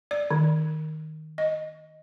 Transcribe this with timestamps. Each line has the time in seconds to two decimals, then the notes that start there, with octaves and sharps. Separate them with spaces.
0.11 D5
0.31 D#3
1.38 D#5